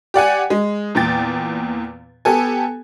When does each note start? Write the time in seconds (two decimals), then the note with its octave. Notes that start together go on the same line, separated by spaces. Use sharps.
0.14 G4 D5 F#5 G#5
0.50 G#3
0.95 E2 A#2 G5 A6
2.25 B3 G4 A4 G#5